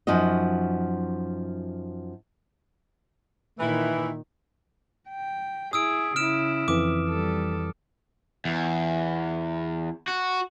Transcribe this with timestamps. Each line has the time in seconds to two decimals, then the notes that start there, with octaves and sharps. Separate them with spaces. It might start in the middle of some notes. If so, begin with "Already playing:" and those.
0.07 F#2 F3 D#4 F#4 D#5
3.59 A#2 D#3 E3 E4
5.09 G5
5.73 E4 G#4 D#6 E6 D7
6.16 C#3 E4 F6 D7 E7
6.68 F2 E3 D6
7.08 G3 A4
8.45 E2
10.08 F#4